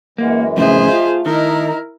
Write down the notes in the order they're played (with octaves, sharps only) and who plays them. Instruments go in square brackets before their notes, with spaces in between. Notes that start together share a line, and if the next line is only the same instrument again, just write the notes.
[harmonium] F#2 E3 G#3 [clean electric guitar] A#3 [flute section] F#5
[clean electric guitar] F2 A2 C#3 [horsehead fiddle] G#4 C5 [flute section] D#5 E5
[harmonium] A3 [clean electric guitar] F4
[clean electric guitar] D#3 [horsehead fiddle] E4 A#4 [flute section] D#5 A#5